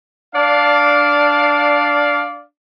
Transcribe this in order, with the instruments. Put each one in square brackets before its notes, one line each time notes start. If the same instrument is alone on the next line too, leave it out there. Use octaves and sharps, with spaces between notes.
[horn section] D4 D5 F5